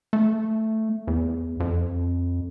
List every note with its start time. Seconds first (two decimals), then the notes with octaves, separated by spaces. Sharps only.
0.13 A3
1.07 E2
1.60 F2